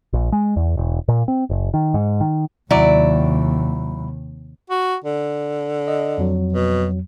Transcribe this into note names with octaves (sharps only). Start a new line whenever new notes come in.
A#1
G#3
E2
E1
A#2
C4
F#1
D#3
G#2
D#3
D#2 C3 F#3 E4 D5
F#4
D3
D#5
F2 F#3
B2